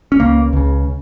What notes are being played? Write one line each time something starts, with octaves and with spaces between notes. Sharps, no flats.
C#4
C#2 C#3 A#3
C#2 C#3